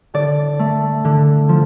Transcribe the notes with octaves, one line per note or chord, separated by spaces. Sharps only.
D3 D5
A3
D3
F3